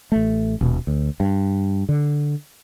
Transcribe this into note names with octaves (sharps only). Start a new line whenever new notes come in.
A1 A3
D#1 B2
D2
G2
D3